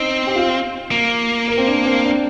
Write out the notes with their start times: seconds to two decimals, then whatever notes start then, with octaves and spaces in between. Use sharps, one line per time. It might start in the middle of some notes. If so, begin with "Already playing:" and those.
Already playing: C4 D#4
0.27 G4
0.36 F4
0.91 A#3
1.48 A#4
1.57 C4
1.66 D4
1.85 C4
2.04 D4